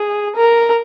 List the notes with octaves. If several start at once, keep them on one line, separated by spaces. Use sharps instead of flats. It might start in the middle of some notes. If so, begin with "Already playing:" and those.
Already playing: G#4
A#4